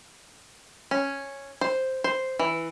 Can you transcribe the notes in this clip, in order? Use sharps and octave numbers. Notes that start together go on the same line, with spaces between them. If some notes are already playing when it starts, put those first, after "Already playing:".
C#4
C5
C5
E3